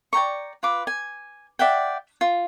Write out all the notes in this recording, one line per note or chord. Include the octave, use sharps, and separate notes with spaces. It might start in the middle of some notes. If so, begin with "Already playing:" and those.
D5 G5 A#5 C#6
F4 B4 D6
G#5
D5 E5 F#5 G5
F4